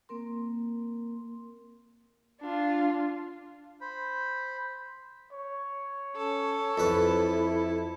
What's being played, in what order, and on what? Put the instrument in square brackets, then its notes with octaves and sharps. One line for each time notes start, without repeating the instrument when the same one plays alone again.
[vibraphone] A#3 C4 A#4 C6
[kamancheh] D4 F4
[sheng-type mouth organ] C5 B5
[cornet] C#5
[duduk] C#4 [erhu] A4
[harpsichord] F2 B4 [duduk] E4